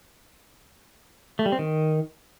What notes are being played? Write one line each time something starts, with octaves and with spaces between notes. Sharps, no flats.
A3
G3
C4
D#3